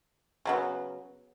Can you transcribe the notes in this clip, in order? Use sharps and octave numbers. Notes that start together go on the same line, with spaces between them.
C#3 F#3 B3